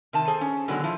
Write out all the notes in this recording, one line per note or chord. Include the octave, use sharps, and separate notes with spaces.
C3 D#3 A5
G#4 A4 C5
C#4
B2 D3 D#3 F#3 G#3
F3 E4